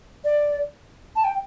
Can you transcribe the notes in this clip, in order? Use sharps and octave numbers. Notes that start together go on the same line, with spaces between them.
D5
A5
G5